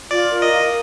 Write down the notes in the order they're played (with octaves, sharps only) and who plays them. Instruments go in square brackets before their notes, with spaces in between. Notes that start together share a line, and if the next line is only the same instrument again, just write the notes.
[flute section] F4 [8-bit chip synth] D5
[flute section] A#4
[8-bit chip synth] D#5
[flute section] F5